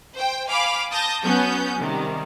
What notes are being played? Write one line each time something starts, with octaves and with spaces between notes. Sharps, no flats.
C5 G5
F5 G#5 B5 D6
A5 D#6 G6 A#6
F#3 B3 C#4 G6
C3 D#3 G3